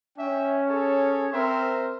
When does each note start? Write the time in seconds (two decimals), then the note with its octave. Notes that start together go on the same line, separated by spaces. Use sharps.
0.18 C#4 E5 G5
0.68 G#4 A4 C#5
1.33 C4 A#4 C5 E5